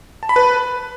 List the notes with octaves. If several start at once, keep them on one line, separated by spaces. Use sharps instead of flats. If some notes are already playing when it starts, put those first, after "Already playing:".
A5
B5
B4